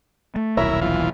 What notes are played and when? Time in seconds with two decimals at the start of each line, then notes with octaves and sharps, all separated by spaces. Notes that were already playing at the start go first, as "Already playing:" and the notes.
0.36 A3
0.57 D#1 B1 E4 A#4 C#5 E5 B5
0.81 E3 F4